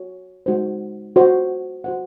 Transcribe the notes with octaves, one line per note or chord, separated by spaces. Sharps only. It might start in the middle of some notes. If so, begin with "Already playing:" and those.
Already playing: F#4 C#5
G#3 D#4 F#4 C5
F#4 C5 D#5
F#4 C5 F#5